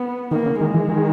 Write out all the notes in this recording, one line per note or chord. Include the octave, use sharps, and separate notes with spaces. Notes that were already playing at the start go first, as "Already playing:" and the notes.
Already playing: B3
D#3 A#3
C#3
D#3 G#3
E3
D#3